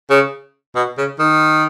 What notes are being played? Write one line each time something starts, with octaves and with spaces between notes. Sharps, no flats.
C#3
B2
C#3
D#3